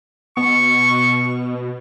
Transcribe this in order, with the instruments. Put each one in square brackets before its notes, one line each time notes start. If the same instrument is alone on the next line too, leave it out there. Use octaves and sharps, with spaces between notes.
[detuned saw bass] B2 [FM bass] B3 [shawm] C#6